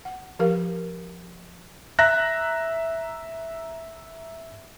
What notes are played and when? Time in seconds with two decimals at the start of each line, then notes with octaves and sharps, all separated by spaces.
0.05 F#5
0.39 F3 G4 A#4 F5
1.99 E5 A#5 F#6 A#6